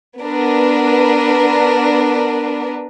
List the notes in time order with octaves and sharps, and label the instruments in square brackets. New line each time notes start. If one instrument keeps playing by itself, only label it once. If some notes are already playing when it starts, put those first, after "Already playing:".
[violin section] B3 D4 A#4 B4